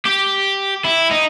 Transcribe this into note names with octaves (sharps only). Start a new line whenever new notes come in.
G4
E4
D#4